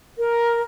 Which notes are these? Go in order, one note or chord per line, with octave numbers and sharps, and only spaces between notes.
A#4